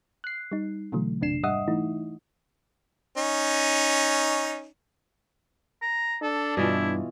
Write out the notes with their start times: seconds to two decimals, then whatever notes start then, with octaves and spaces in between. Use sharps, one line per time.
0.24 F#6 C7
0.52 G3 D#4
0.92 B2 D3 E3 F#3 A3
1.21 A1 F2 C3 D4 C7 E7
1.43 G#2 G3 D#5 E5 F#5 D#6
1.68 E3 A3 D#4 E4
3.17 C#4 D#4
5.82 A#5
6.22 D4 A4
6.57 G2 B2 E3 E4 F4